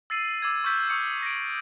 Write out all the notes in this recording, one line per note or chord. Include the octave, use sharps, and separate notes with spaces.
E6 A6 C7 D#7 F#7
D6 E6 G#6
C#6 E6 F6 G6 B6
C#6 D#6 C#7
A#6 D7